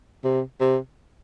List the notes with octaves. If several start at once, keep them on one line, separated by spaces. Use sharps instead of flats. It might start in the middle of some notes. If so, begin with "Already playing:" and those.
C3
C3